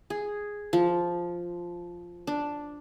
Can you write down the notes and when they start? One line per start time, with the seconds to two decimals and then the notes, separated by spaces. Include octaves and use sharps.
0.10 G#4
0.73 F3
2.27 D4